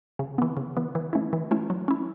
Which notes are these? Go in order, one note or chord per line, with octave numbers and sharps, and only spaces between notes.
C#3
E3 B3
C#3
E3 B3
E3
A3 C#4 E4
E3
A3 C#4 E4
F#3
C#4 E4